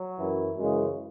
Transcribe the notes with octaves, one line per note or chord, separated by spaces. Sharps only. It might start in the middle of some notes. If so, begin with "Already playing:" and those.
Already playing: F#3
F#2 E3
F#2 C#3 E3 G#3